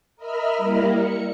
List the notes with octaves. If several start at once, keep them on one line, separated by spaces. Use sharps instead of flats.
A#4 D#5 E5 B5 F6
G3 A#3 E4 A#4
C#7